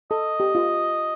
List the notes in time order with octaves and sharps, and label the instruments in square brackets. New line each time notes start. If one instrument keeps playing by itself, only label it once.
[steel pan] A4 [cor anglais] D#5
[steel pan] G4
F4